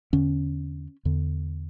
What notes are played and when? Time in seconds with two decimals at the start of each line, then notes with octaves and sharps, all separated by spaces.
0.13 E2 D3 C#4
1.05 E2 D3